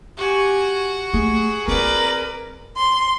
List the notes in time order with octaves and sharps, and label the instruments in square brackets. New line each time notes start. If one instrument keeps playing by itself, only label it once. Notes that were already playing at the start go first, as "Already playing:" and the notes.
[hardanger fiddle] F#4 [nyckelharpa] G4 G#5
[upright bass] A3 [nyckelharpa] G#4
[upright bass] C4 F4 [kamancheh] A#4 [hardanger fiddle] B4 D5
[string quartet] C6